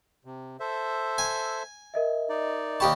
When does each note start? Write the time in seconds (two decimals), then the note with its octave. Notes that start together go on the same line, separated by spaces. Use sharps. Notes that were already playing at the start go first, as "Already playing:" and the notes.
0.25 C3
0.60 A4 C5 E5
1.18 G#5
1.94 A#4 D#5 E5
2.29 D#4 D5
2.80 D#2 G4 G5 A5 B5 C#6